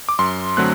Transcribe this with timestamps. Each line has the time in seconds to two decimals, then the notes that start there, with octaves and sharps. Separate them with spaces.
0.09 D6
0.19 F#2 C6
0.57 D3 F#3 A3 C4 F#6